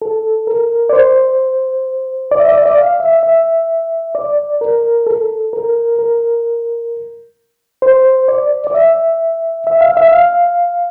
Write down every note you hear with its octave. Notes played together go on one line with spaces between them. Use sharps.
A4
A#4
D5
C5
D5
E5
D5
E5
D5
F5
E5
E5
D5
A#4
A4
A#4
A#4
C5
D5
D5
E5
E5
F5
E5
F5